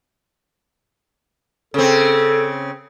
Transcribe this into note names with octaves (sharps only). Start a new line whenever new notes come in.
C#3 C4 A4